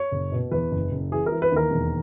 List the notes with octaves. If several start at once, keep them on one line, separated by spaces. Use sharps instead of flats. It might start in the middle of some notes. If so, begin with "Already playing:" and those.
Already playing: C#5
F#1
B2
E2 B4
F#1
F#1
E3 G#4
A#4
E3
B4
D#2 A#4
E1